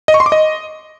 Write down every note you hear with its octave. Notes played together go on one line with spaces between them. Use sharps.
D#5
C#6
C6
D6
D#5